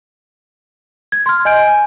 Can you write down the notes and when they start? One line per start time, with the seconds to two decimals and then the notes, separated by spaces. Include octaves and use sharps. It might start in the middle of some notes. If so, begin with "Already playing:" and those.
1.12 G#6
1.26 C6 F6
1.45 D#5 G#5 G6 D7
1.67 G#5